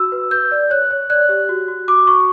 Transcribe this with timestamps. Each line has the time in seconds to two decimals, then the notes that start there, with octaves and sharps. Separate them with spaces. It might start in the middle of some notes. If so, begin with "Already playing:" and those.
Already playing: F#4 E6
0.12 B4
0.31 B4 G6
0.51 D5
0.70 C#5 F#6
0.91 C#5
1.10 D5 F#6
1.29 G4
1.49 F#4
1.68 F#4
1.88 F#4 D6
2.07 F#4 C#6